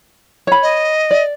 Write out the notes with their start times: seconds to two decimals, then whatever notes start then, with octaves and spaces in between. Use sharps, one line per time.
0.47 C#5 B5
0.63 D#5
1.11 D5